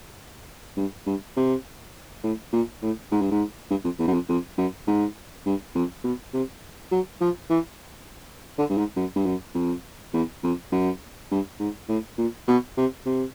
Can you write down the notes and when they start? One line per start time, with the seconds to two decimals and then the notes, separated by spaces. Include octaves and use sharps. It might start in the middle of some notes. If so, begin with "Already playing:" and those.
0.77 G2
1.06 G2
1.37 C3
2.24 A2
2.53 A#2
2.82 A2
3.11 G#2
3.21 G2
3.31 G#2
3.71 G2
3.84 F2
3.99 E2
4.07 F#2
4.13 F2
4.29 F2
4.58 F#2
4.87 G#2
5.46 G2
5.75 F2
6.04 B2
6.34 C3
6.91 F#3
7.21 F3
7.50 E3
8.58 D3
8.69 G2
8.78 G#2
8.96 F#2
9.16 G2
9.26 F#2
9.55 F2
10.14 E2
10.44 F2
10.72 F#2
11.31 G2
11.59 G#2
11.89 A2
12.18 A#2
12.48 B2
12.77 C3
13.06 C3